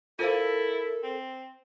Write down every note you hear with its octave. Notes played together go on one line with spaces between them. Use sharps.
E4 F4 A4 A#4 C5 F5
C4